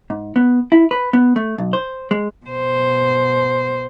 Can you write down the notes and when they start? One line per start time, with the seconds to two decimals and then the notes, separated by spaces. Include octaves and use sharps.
0.10 G#2
0.36 B3
0.72 E4
0.91 B4
1.13 B3
1.36 A3
1.58 B1
1.73 C5
2.11 G#3
2.47 B2 C5